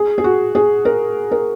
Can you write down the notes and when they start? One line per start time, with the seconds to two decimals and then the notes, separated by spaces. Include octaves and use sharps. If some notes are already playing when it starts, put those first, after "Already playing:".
Already playing: G#4
0.18 G#4
0.24 F#4
0.55 G#4
0.85 A#4
1.31 A#4